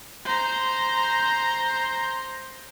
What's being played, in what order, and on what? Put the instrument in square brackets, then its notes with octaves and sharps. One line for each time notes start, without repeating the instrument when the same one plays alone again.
[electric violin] C5 A#5